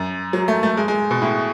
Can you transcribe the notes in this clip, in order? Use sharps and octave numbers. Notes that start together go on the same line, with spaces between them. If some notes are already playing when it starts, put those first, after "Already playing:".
Already playing: F#2
F#3
A3
A3
G#3
G#3
B2
A2